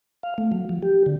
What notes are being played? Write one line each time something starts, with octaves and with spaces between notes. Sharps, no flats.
F5
A3
F#3
F3
G4
D3